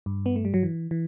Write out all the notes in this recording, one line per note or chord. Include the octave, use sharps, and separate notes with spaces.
G2
B3
A3
G3
F#3
E3
E3